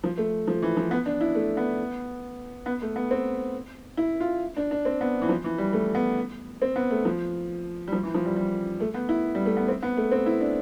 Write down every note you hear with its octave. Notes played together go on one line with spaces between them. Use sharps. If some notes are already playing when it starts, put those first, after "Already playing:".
F3
A3
F3
E3
F3
B3
D4
E4
A3
B3
B3
A3
B3
C4
E4
F4
D4
D4
C4
B3
E3
F3
E3
G3
A3
B3
C4
B3
A3
F3
G3
F3
E3
F3
G3
G3
A3
B3
E4
G3
A3
B3
C4
B3
A3
C4
E4
D4